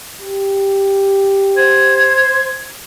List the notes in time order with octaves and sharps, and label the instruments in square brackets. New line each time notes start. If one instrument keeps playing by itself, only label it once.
[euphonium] G4
[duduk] C5 [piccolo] G#6